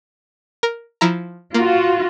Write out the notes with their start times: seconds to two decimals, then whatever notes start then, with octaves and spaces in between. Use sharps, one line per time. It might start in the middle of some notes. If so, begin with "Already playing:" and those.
0.63 A#4
1.01 F3 E4 A#5
1.54 A#3 F4 F#4